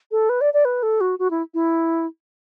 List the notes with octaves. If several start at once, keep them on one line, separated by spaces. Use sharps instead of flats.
A4
B4
D5
D5
B4
A4
F#4
F#4
E4
E4